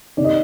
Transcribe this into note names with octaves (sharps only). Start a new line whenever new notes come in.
C3 D#3 D5
D#5